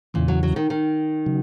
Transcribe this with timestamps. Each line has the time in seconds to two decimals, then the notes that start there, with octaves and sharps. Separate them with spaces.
0.14 E2 A#2 C#3 E3
0.28 F#3
0.43 F#3
0.56 D#3
0.70 D#3
1.26 C#3 F#3